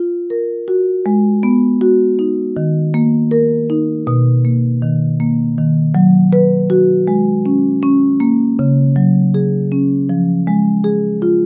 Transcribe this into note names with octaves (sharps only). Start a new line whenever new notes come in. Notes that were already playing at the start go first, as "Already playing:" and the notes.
Already playing: F4
A#4
F#4
G#3
B3
F#4
D#4
D#3
A#3
A#4
D#4
B2
A#3
D#3
A#3
D#3
F#3
B4
F#4
G#3
C#4
C#4
A#3
C#3
F#3
G#4
C#4
F3
G#3
G#4
F4